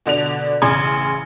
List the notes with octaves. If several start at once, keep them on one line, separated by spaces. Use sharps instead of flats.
B2 D3 D4 F7
A1 C#3 G#4 C6 G#6